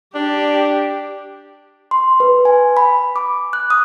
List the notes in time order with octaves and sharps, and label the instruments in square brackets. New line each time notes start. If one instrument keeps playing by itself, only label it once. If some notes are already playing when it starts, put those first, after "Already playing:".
[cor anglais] D4 [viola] G4
[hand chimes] C6
B4
G#5
B5
D6
F#6
D#6